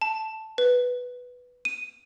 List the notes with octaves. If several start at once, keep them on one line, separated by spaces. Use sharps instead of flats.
A5
B4
D#7